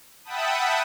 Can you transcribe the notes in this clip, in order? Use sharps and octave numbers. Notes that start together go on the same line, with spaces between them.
E5 F#5 G5 A5 B5 D#6